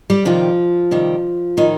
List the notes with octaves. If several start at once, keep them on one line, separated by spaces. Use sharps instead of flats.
G3 G4
C3 D#3 F3 G3 F4
C3 D#3 G3
A2 D#3 F3 D#4